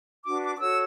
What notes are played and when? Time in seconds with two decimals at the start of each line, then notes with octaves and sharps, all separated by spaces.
0.24 D4 F#4 B4 D6
0.43 D6
0.56 D6
0.60 F#4 A4 C#5 E6